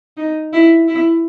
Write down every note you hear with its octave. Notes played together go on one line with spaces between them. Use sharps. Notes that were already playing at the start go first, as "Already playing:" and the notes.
D#4
E4
E4